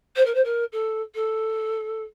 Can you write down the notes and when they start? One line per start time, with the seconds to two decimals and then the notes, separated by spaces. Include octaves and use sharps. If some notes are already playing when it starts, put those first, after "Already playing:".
0.16 C5
0.25 A#4
0.35 C5
0.45 A#4
0.72 A4
1.15 A4